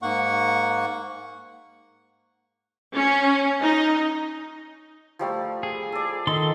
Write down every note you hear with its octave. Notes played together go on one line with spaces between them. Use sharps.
G#2 A#3 F#5 C#6
C#4
D#4
F3 G3 A3
G#4
A4 D5
D#3 A4 D#5 C6